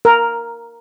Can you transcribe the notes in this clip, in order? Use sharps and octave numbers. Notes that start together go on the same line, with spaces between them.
A#4